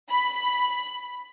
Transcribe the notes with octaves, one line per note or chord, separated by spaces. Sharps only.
B5